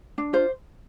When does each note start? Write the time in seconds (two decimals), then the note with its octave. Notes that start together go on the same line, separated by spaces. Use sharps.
0.18 D4
0.33 F4 C5